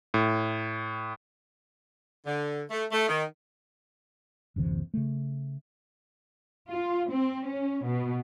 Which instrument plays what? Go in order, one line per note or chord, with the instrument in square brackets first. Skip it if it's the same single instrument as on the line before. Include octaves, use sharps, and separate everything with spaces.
[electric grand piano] A2
[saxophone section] D3
A3
A3
D#3
[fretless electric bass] F#1 D2 C3 E3
C#3 A3
[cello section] F4
C4
C#4
B2